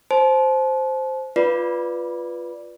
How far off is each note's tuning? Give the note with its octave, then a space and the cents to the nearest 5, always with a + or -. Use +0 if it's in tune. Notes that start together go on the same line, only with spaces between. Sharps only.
C5 +0 A5 -35
F4 +0 B4 +0 D5 +0